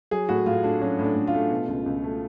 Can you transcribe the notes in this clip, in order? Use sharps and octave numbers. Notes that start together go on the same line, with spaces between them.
F#3 G#4
A2 F#4
A2 F4
A3 D4
F#3 C#4
A2
D4
A2
F4
A3
B2
C#2
C#2
A3